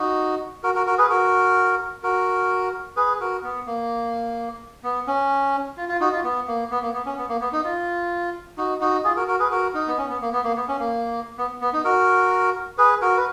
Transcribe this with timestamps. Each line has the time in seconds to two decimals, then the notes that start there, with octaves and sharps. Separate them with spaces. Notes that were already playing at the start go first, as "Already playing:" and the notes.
Already playing: D#4 F#4
0.63 F#4 A#4
0.75 F#4 A#4
0.87 F#4 A#4
0.98 G#4 B4
1.10 F#4 A#4
2.03 F#4 A#4
2.97 G#4 B4
3.20 F#4 A#4
3.43 B3
3.67 A#3
4.83 B3
5.07 C#4
5.77 F4
5.89 F4
6.00 D#4 F#4
6.12 F4
6.24 B3
6.48 A#3
6.71 B3
6.82 A#3
6.94 B3
7.06 C#4
7.18 B3
7.29 A#3
7.41 B3
7.53 D#4
7.64 F4
8.57 D#4 F#4
8.81 D#4 F#4
9.04 F4 G#4
9.16 F#4 A#4
9.28 F#4 A#4
9.40 G#4 B4
9.51 F#4 A#4
9.74 D#4
9.87 B3
9.98 C#4
10.09 B3
10.21 A#3
10.33 B3
10.44 A#3
10.57 B3
10.68 C#4
10.79 A#3
11.38 B3
11.62 B3
11.73 D#4
11.84 F#4 A#4
12.78 G#4 B4
13.01 F#4 A#4
13.17 B4